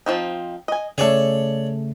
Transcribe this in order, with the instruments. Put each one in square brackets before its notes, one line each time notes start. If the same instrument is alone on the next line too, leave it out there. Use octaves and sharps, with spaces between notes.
[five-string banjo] F3 C4 D#4
D#5 G#5
[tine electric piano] C#3 A3 [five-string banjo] G#4 A4 [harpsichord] C#5 D5